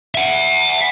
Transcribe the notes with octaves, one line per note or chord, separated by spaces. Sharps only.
E5 F#5